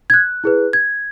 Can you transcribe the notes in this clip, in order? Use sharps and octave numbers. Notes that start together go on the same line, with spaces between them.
G#6
F#6
E4 G#4 B4
G#6